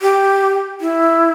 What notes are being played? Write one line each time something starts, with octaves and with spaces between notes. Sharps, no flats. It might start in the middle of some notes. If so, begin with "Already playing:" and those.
G4
E4